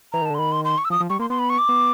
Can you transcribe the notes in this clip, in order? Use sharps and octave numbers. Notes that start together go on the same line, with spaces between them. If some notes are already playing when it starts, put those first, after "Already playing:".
E3 A#5
D#3
D3 A5
C6
D#3 B5
C6
C6
C#6
E6
F3 D#6
F3
G3 C#6
A#3 C6
B3 C6
B5
C#6
D6
B3